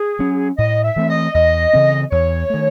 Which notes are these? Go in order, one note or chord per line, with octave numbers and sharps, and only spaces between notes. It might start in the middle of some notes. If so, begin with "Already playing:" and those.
Already playing: G#4
F#3 C#4
A2 D#5
E5
E3 A3 C4
D#5
E2 D#5
C#3 E3 C4
E2 C#5
D#3 A3